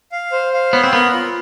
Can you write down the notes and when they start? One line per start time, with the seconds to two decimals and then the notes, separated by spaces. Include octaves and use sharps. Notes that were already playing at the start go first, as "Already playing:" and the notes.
0.12 F5
0.32 C5
0.53 F5
0.72 B3 C#5
0.84 C4
0.93 B3 A#4
1.14 F4